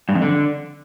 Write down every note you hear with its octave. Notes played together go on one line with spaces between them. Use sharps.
G2
F2
D3